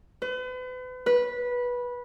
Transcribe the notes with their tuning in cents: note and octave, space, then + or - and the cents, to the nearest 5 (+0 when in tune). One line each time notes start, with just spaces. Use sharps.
B4 +40
B4 -15